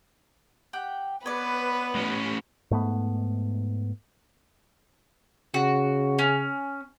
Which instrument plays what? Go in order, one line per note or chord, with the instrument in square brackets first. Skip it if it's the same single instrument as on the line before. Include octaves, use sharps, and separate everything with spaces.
[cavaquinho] G4 F#5 G5
[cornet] B3 [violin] B4 [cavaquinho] C#5 D5
[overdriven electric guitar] A2 C#4
[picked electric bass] G#2 A3 B3
[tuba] C#3 [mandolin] F#4
[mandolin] C#4